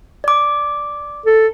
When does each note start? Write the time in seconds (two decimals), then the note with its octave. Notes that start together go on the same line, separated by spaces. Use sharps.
0.24 D5 D6
1.26 A4